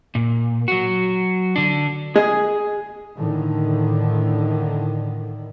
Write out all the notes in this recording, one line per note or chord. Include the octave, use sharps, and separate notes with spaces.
A#2
F#3 F#4
D3 D4
G#4 D#5
A2 D3 D#3